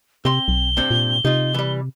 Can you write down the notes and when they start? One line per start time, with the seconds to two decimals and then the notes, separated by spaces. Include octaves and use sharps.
0.25 C3 C4 C6 G7
0.48 B1
0.77 G2 C3 C4
0.91 A#2
1.25 C3 D#4 F4
1.54 E3 G3